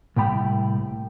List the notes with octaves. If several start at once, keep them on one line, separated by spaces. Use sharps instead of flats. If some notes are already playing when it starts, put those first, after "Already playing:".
C2 A2 G5 B5